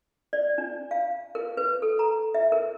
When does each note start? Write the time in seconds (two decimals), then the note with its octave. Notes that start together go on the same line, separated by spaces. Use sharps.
0.33 D5
0.58 D4
0.91 F5
1.35 A#4
1.57 B4
1.82 A4
1.99 A#5
2.34 E5
2.52 A#4